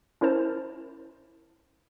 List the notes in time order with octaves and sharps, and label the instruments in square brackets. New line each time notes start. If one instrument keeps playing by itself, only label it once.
[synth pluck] C#4 E4 A#4 C5 A5